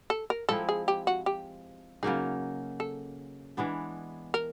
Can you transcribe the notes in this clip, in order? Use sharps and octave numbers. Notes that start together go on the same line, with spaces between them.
A4
A#4
F3 G#3 C4 E4 A4
G#4
G4
F#4
G4
C#3 F#3 A#3 D#4 G#4
A4
E3 G#3 B3 D4
A#4